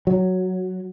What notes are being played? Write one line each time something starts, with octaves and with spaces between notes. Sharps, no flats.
F#3